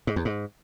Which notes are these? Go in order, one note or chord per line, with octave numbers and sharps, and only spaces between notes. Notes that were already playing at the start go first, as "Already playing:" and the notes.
G#2
E2
G#2